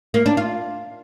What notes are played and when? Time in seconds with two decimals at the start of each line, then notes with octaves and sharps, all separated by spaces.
0.14 A#3
0.26 D4
0.37 F4